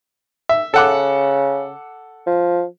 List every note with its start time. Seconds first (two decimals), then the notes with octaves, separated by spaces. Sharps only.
0.49 E5
0.74 C#3 A4 F#5 D6
2.27 F3